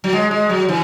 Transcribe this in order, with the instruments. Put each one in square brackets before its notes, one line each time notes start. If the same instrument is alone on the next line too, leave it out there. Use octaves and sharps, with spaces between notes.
[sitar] F#3
G#3
G#3
F#3
E3